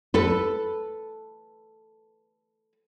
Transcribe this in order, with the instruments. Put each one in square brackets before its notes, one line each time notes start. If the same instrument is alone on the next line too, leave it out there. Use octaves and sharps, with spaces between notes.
[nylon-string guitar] A4 B4